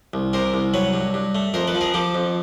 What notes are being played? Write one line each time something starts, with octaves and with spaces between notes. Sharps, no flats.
C2
C3 A#4 C5
C2
F#3 B4 C#5
G2
G2
A3
F2 A#4 C5
A4 B4
F3
G#4 A#4
F3 G4 A4
F2